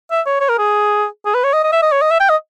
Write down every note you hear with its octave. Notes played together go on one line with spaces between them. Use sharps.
E5
C#5
C#5
A#4
G#4
G#4
B4
C#5
D#5
D#5
E5
D#5
C#5
D#5
E5
G5
D#5